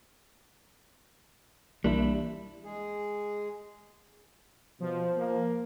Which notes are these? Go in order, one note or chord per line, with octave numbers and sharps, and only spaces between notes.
B1 E3 G3 A#3 D4 E4
G#3 G#4
B2 F3
A#3